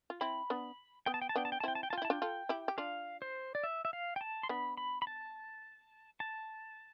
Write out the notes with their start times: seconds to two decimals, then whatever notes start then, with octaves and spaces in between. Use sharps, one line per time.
0.10 F4
0.21 C4 E4 B5
0.50 B3 D4
1.06 B3 G5
1.14 A5
1.22 G5
1.29 A5
1.36 B3 D4 G5
1.45 A5
1.52 G5
1.60 A5
1.63 C4 E4 G5
1.75 A5
1.83 G5
1.90 F4 A5
1.98 G5
2.02 E4
2.05 A5
2.10 D4 F4 G5
2.22 F4 A4
2.49 E4 G4
2.68 G4
2.78 D4 F4 F5
3.22 C5
3.55 D5
3.64 E5
3.85 E5
3.93 F5
4.16 G5
4.21 A5
4.43 C6
4.49 B3 D4 B5
4.77 B5
5.02 B5
5.07 A5
6.20 A5